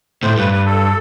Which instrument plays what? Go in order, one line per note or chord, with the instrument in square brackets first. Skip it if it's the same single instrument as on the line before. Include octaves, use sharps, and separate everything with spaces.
[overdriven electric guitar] A2 [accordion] C5
[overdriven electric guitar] G2 [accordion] B4
[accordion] B4
A4